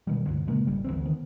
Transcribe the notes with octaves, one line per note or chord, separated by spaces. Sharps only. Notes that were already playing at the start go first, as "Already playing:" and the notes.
B2 D#3 G3
C#2 G2 D3
A#2 C#3 G#3 A#3
G#1 G3
D2 E3 C4
D#3 B3